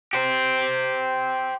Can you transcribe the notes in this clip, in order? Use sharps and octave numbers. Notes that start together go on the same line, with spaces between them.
G4 C5